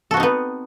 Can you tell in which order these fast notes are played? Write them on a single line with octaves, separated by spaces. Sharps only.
A4 F#4 C4 D#4 B3